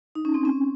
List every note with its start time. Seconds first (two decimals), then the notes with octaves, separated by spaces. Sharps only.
0.15 D#4
0.25 C#4
0.34 C4
0.45 C#4